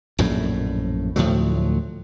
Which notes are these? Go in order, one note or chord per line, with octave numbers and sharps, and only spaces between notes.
A#1 F#2 A2
D2 A2 F3 F#3